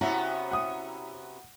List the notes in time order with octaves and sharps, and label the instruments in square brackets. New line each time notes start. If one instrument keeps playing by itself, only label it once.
[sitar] C3 B3 C#4 [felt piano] E4 E5 A#5 [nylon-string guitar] F#4
[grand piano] F#5 D#6